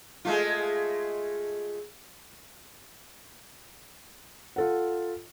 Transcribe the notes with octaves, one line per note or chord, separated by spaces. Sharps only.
G#3 A3 F4
F4 A4 F#5